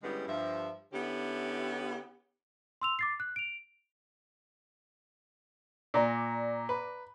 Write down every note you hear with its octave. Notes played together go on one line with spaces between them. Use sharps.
D3 G3 G#3 B3 C#4 E4
G2 F3 E5
D3 B3 C#4 E4 G4
C6 E6 F7
D6 A6 C7
F#6
D7 F7
A#2 D5 A#5 D6
B4